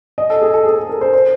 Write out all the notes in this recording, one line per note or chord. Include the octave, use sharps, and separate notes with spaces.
D#5
A4
G#4
A4
G#4
A4
A#4
C5
C5